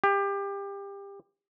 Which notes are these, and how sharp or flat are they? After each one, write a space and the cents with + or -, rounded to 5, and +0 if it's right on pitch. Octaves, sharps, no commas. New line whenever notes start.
G4 +25